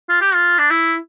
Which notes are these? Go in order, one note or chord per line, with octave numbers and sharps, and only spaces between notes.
F4
G4
F4
D4
E4